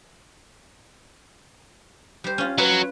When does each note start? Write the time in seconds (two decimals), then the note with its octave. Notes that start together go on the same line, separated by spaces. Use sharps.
2.24 G3 C5
2.38 C#4 F4
2.58 F#3 B4